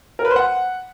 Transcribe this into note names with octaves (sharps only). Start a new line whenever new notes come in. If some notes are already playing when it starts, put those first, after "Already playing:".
A#4
B4
C5
F#5